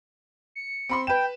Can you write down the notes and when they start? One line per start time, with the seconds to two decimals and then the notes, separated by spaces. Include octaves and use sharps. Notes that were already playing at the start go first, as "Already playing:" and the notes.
0.55 C#7
0.89 C4 B5 C6
1.07 B4 G5 E7